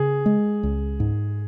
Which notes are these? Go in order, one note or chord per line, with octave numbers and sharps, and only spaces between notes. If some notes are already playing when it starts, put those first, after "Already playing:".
Already playing: C#3 G#4
G#3
C#2
G#2